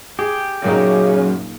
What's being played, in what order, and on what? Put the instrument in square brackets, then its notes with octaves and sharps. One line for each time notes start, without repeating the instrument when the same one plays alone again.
[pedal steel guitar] G4 [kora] G#4
[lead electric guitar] F#2 [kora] A#2 A#3 D#4 [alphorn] C#3